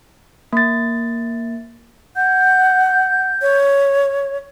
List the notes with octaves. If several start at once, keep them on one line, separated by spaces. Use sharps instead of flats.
A#3 A6
F#5 G6
C#5